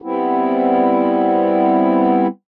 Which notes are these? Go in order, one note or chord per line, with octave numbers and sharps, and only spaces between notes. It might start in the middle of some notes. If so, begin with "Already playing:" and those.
G3 B3 C4 E4